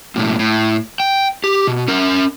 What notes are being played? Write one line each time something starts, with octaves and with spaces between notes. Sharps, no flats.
B1 A2
A2
G5
G4
B2
C#4 A#4